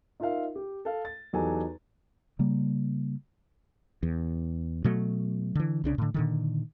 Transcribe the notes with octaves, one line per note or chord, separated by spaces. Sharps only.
D#4 F4 A#4 E5 F5
G4
A4 F5
A6
E2 F#3 D#4 G4 A4 G#5
C#3 G3 A#3
E2
B2 F#3 A3
D3 E3
C2 C#3 D4
A2 D3
A#2 D3 D#3